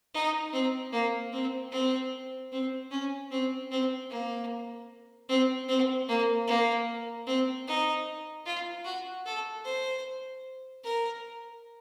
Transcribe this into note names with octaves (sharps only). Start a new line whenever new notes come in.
D#4
C4
A#3
C4
C4
C4
C#4
C4
C4
A#3
C4
C4
A#3
A#3
C4
D#4
F4
F#4
A4
C5
A#4